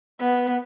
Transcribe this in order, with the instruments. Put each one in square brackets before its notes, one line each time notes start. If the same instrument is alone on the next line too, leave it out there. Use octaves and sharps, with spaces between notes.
[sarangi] B3